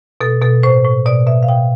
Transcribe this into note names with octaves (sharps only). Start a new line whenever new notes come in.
B2 A4
B2 A4
A2 C5
A2
B2 D5
B2 E5
F5
B2 G5